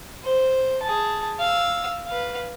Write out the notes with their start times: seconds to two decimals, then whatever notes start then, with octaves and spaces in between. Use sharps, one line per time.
0.23 C5
0.82 G#4 A5
1.39 F5 E6
2.07 B4 F5